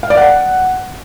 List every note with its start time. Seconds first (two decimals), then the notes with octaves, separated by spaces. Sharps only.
0.03 F5
0.10 D5
0.17 F#5